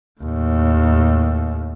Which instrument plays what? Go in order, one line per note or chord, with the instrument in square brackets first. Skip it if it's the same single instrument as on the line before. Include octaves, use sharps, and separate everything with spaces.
[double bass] D#2 A2